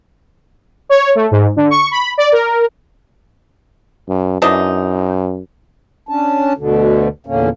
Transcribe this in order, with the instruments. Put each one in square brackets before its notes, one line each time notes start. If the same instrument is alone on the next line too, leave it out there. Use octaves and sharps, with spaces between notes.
[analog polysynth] C#5
A3
G#2
D3
C#6
B5
D5
A#4
[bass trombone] F#2
[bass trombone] F#2 [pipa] E3 D4 D#4
[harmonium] C#4 D4 A5
D2 B2 D3
E2 A#2 D3 A#3 C#4